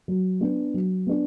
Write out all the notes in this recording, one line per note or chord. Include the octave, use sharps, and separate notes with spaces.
F#3
B3 D4
F#3
B3 D4